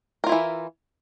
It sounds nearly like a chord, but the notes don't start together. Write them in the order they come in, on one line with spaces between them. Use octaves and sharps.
A#4 F4 E4 E3